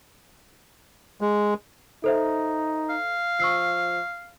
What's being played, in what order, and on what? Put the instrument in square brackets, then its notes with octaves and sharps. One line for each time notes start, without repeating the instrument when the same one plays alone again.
[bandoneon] G#3
[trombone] D#4 [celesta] A4 C5 E5
[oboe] F5
[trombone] F3 [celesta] C#6 E6 C7